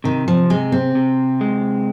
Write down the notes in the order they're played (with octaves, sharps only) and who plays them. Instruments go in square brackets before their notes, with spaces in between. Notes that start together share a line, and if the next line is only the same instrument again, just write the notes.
[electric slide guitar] C3 [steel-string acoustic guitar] D#3
[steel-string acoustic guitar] F3
[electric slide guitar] C3 [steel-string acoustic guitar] G#3
[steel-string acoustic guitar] C4
[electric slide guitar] C3
G#3